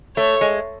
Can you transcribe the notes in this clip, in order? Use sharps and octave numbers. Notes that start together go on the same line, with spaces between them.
A3 C#5
G#3